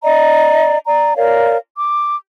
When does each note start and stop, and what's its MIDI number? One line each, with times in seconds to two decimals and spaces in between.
0.03 0.77 74
0.03 0.77 75
0.03 0.77 82
0.86 1.13 74
0.86 1.13 82
1.16 1.56 70
1.16 1.56 73
1.16 1.56 74
1.16 1.56 77
1.77 2.15 86